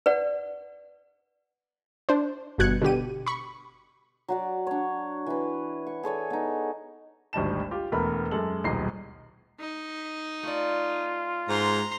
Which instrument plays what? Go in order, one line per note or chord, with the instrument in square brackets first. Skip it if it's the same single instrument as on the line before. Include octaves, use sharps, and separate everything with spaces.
[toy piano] B4 D5 F#5
[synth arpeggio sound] D4 C5
G1 G2 B2 F#6 G#6 C#7
B2 D3 G4 D#7
B5 C#6
[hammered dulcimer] F#3 F#4 D5
D4 C#5
E3 B4
C#6
G#4 A4 C#5 D5
B3 D#4
[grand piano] G#1 D2 G3 D#5 A5 E7
F4 G4
E1 A3 B3 A#4 B5
F#2 G#3 A4 F#7
D#1 B1 G#3 D#5 C7
[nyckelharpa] D#4
[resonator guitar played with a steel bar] A3 D5 [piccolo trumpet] F4
[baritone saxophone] G#2 [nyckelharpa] A#5 C6